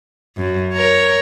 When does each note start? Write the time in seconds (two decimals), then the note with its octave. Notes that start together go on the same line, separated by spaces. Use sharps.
0.37 F#2
0.74 A#4 C#5